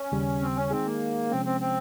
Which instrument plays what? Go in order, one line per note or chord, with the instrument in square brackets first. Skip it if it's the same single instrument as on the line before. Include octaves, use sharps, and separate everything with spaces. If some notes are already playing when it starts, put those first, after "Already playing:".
Already playing: [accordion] C#4
[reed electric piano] D#2 C#3 G3
[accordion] C4
C#4
[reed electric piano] D#3 G#3 D#4 G#4 [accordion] C4
[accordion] A#3
[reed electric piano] C3 F3 G#3 C#4 [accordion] C4
[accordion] C4
C4